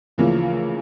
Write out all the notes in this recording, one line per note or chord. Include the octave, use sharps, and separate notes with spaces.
D2 C#3 E3 F3 A#3